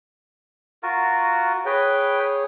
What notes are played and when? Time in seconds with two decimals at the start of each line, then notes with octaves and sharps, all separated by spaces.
0.83 F4 F#4 A#4
1.66 G#4 B4 C#5 G5